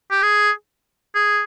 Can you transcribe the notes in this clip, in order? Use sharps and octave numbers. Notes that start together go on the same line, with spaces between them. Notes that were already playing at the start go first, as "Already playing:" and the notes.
G4
G#4
G#4